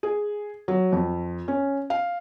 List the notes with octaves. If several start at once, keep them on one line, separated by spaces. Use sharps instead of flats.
G#4
F#3
F2
C#4
F5